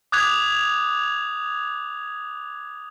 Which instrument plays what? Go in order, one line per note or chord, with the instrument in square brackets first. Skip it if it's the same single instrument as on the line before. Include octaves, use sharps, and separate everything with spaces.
[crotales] D6 D#6 F#6 G#6 F7